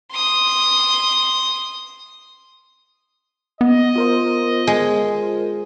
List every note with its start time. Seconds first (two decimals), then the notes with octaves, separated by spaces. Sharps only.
0.13 C6 D#6
3.61 B3 D#5
3.96 F4 A#4 C5
4.67 G#3